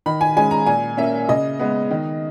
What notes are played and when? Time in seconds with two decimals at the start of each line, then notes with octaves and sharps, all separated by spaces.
0.06 D#3 B5
0.21 G#5
0.36 G#3 C#4 G#5
0.51 A#5
0.66 A#2 G#5
0.97 A#3 C#4 E5
1.29 C#3 D#5
1.59 G#3 B3
1.91 D#3